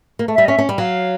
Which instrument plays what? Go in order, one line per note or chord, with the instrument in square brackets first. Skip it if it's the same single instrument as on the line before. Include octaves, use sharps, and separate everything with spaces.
[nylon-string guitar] A#3
A3
[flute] E5
[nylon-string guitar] G3
[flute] D#5
[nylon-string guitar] C#4 [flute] E5
[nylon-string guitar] C#4
G3
[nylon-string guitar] F#3 [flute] F5